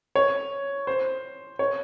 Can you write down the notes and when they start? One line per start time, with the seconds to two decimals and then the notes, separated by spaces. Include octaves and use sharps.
0.16 C#5
0.87 C5
1.59 C#5